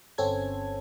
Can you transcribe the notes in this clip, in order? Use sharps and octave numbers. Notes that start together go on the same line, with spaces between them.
G1 C4 C#4 A4 G#6